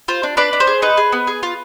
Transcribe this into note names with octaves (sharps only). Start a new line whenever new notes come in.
F4 C5
D4
D4 B4 D5
D4
C5
G#4
D#4 B4
G#4
B3
G#4
F4